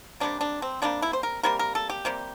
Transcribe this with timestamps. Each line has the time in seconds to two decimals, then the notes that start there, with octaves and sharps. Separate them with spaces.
0.20 C3 G3 A#3 D4
0.41 D4
0.62 C4
0.82 C3 G3 A#3 D4
1.02 E4
1.13 C5
1.23 A#4
1.43 C3 G3 A#3 A#4
1.59 A#4
1.75 A4
1.90 G4
2.05 C3 G3 A#3